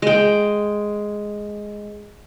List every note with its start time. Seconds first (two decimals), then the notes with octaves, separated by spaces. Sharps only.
0.02 G#3 G5